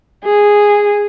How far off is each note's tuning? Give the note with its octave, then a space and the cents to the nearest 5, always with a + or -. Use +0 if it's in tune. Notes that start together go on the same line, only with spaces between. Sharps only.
G#4 -10